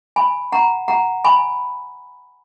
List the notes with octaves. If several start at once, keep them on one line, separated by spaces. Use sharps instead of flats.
G#5 B5
F#5 A#5
F#5 A#5
G#5 B5